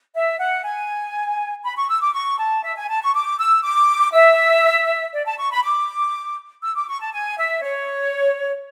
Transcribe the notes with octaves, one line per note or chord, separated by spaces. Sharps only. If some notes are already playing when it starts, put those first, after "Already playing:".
E5
F#5
G#5
B5
C#6
E6
D6
C#6
A5
E5
G#5
A5
C#6
D6
E6
D6
E5
D5
A5
C#6
B5
D6
E6
D6
C#6
A5
G#5
E5
C#5